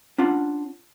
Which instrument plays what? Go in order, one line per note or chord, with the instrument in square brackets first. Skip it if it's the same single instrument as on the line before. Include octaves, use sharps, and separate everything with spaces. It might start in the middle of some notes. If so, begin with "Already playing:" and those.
[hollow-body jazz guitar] C#4 D4 F4 F#5